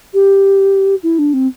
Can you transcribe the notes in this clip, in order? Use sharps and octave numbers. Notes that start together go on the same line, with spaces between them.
G4
E4
D4
C4